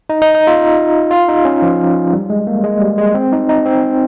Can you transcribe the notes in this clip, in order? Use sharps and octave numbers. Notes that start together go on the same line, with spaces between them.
D#4
D#4
D#4
F4
F4
D#4
C#4
F3
G3
G#3
A#3
G#3
G3
G#3
C4
D#4
D#4
C4